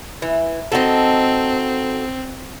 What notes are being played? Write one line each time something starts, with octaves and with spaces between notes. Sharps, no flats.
E3
C4 D#4 F#4 A4